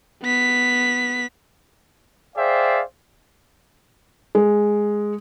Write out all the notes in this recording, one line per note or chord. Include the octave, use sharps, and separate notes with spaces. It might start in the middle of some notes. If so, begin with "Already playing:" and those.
B3 B6
G#4 C5 D5 E5 F5 G5
G#3